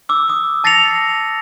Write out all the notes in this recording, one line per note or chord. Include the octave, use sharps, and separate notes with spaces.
D6 E6
D6 D#6
A5 A6 A#6 C7 C#7 F7